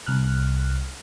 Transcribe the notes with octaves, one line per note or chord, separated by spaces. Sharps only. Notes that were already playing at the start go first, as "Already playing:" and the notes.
C2 F6 F#6